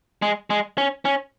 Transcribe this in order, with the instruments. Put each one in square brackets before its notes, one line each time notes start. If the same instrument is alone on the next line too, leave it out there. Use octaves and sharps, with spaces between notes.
[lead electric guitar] G#3
G#3
C#4
C#4